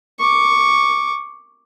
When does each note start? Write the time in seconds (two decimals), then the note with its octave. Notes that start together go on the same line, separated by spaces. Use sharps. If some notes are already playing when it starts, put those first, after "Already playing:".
0.19 C#6 D6